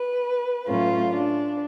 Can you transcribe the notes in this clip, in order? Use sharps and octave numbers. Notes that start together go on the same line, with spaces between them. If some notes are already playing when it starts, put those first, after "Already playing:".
Already playing: B4
A2 F#3 A3 C#4 F4
D4